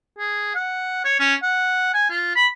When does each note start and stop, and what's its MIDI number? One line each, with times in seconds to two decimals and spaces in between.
0.18 0.54 68
0.55 1.00 78
1.04 1.19 73
1.20 1.34 61
1.43 1.92 78
1.94 2.06 80
2.10 2.33 65
2.36 2.47 83